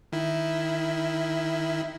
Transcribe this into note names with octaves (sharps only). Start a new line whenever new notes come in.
D#3 E4